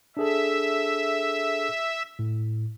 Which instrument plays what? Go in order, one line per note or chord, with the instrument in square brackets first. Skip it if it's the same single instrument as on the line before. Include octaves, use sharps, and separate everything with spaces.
[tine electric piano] D4 G#4 A4 [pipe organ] E5
[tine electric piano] A2